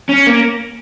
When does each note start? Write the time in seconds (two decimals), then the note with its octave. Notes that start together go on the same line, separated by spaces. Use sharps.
0.09 C#4
0.27 A#3